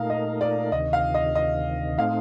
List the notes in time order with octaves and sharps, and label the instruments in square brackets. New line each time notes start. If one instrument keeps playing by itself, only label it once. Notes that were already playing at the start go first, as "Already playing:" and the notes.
Already playing: [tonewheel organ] A#2 A3 D#4 A#4 [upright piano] F5
[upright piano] D#5
D5
[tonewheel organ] D2 C3 D#3 [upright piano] D#5
[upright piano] F5
D#5
D#5
[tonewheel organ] A2 A3 C4 D#4 [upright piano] F5